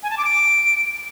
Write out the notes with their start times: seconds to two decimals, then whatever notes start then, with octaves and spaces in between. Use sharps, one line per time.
0.03 G#5
0.10 A5
0.18 D6
0.25 D7